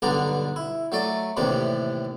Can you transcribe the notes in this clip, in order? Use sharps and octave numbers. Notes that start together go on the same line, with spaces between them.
B1 G2 D3 B3 D4 A#5
E4
F#3 A3 D5
D#2 A2 C3 E3 D4